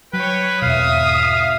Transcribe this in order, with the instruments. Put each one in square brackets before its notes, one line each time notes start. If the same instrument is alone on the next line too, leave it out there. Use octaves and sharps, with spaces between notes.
[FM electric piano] F#3 [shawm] B4 [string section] C#5 G5
[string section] G#1 E5 [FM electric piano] E2 B2 [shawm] F5 [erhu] D#6